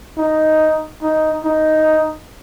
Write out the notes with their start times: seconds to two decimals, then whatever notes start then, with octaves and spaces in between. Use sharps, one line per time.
0.18 D#4
1.03 D#4
1.45 D#4